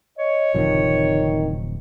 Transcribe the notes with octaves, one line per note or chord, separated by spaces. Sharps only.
C#5 D#5
D1 C3 D#3 F3